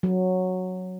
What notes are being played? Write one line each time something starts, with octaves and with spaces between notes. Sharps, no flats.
F#3